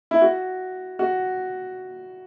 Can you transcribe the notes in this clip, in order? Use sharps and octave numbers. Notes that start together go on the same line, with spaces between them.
E4
F#4
F#4